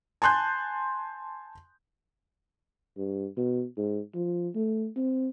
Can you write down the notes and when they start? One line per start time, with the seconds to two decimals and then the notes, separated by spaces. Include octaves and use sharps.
0.22 G#5 A5 C6 F#6 G6
2.97 G2
3.37 B2
3.78 G#2
4.14 F3
4.55 A3
4.96 C4